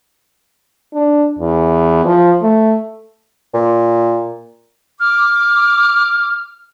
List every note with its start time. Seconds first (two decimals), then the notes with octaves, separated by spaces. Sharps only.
0.94 D4
1.38 E2
2.05 F3
2.42 A3
3.54 A#2
5.00 D6 F6